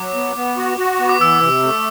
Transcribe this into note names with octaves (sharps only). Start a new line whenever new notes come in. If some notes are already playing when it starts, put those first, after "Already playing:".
Already playing: F#3 D6
B3
B3
F#4
F#4
B3
D6
E3 E6
C3
A3